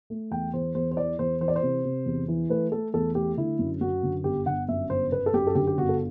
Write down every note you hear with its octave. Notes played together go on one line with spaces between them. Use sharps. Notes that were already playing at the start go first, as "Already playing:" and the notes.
A3
E2 G5
E2 C5
E2 C5
C5
E3 D5
E2 C5
E3 C5
D5
C5
C3
C3
E2
E3
A3 B4
A3 A4
E2 A4
A3 G4
D3 E4
F#2
F#2 F#4
D3
G1 G4
G1 F#5
F#2 E5
G1 C5
G1 B4
A4
F#2 G4
A4
D3 G4
G4
G1 F#4
A4